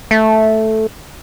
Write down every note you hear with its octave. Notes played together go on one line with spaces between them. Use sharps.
A3